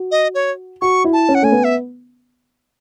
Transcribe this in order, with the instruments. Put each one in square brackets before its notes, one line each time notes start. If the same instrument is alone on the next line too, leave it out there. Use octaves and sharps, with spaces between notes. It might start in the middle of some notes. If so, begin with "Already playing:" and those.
Already playing: [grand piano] F#4
[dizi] D#5
C#5
[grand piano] F#4 [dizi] C#6
[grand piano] E4
[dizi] A5
[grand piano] C#4
[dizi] F#5
[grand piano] A3 [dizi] G#5
[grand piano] B3
[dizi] E5